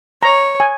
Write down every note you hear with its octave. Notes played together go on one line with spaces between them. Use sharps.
C#5 A#5
G#5